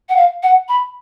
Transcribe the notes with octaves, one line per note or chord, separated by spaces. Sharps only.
F#5
F5
F#5
B5